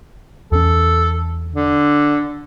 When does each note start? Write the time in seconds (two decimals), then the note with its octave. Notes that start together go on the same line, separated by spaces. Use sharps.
0.52 E2 C#4 A4
1.53 D3